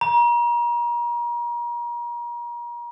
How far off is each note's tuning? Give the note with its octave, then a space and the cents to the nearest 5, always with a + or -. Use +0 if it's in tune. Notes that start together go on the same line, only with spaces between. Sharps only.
A#5 +35